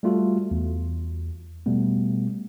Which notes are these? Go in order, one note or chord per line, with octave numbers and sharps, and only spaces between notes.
G3 A3 F4 F#4 A4
E2
B2 G3 A3 B3